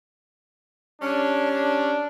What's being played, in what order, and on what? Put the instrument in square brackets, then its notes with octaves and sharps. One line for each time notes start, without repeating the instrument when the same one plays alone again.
[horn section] G3 C#4 [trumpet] D4
[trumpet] D4